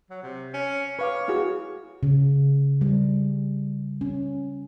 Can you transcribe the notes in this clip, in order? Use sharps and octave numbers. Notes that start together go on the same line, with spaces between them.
F#3
C3
C#4
B4 C#5 F5 D6
E4 F#4 G#4
C#3
G3
C#4